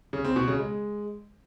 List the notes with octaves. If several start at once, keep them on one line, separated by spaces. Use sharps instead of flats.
C#3
C4
B2
C#3
G#3